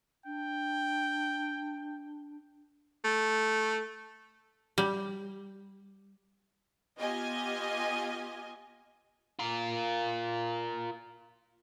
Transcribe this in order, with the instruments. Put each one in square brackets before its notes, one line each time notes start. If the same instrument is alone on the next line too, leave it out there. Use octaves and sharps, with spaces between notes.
[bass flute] D4 [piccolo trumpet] G5
[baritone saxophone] A3
[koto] G3
[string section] B3 F4 G4 D#5 G#5
[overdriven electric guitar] F4 A#4